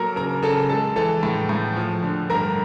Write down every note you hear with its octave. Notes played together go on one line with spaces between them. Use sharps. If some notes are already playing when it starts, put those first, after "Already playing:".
Already playing: F#3 A#3 A4 A#4 A5 A#5
C#3 A#4 A#5
C#3 A4 A5
G#3 A4 A5
E3 A4 A5
A2
A2
F3
D3
G2 A#4 A#5